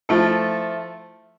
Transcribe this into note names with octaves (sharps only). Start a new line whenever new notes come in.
F3 A3 E4 A4